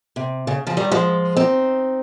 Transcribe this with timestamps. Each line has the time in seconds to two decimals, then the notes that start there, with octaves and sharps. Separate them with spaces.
0.16 C3
0.47 C#3
0.67 C#3 F3
0.77 D#3 G3
0.92 F3 G#3
1.37 C4 D#4